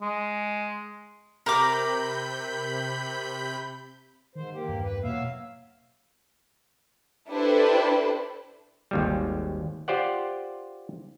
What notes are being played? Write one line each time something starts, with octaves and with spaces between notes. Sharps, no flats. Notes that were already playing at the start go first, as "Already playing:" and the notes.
G#3
C3 A#4 B5 D6 G6
G#2 D#3 C5
A#3 G4
E2 G2
B4
B2 E3 F#3 A#3 E5 F5
D4 E4 G4 A4 B4 C5
G#1 D#2 G3
F4 G4 C5 D5 F#5